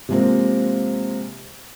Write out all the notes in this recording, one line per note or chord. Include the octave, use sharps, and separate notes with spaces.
C3 F3 G#3 A#3 C4